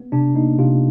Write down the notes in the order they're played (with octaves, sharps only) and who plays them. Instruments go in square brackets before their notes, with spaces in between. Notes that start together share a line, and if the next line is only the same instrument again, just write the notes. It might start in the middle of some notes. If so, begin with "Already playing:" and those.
Already playing: [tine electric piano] B3
C3 D4
A#3 D#4
C3 F4